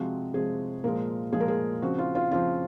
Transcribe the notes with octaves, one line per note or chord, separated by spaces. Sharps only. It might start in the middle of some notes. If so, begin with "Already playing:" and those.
Already playing: C3 F3 G#3 C4 F#4
C3 F3 G#3 C4 G#4
A#2 F3 G#3 A#4
A#2 F3 G#3 G#4
A#4
G#4
C#3 F3 C4 F#4
F4
F4
C#3 F3 C4 F4